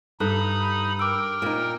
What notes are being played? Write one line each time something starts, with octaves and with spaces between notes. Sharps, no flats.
G2 D#4 A4 B5 D#6 F#6
A#4 G5 D6 E6
A#2 D#4